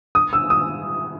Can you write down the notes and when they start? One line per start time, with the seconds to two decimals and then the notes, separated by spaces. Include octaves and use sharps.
0.15 D#6
0.33 E6
0.50 D#6